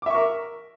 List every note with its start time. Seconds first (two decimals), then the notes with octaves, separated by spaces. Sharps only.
0.02 D6
0.06 E5
0.10 C#6
0.14 A#4